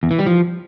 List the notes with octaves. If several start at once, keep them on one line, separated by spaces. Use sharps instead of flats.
E2
E3
G3
F3